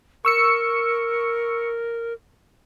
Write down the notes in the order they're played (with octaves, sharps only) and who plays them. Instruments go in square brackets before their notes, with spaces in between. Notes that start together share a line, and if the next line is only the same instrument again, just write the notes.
[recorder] A#4 [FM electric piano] C#6 E6 C#7